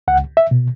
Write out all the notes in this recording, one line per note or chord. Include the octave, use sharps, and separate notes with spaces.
C#2 F#5
E5
B2